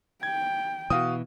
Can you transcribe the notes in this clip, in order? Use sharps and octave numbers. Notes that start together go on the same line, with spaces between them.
G5 G#6
B2 E3 F#4 F5 D#6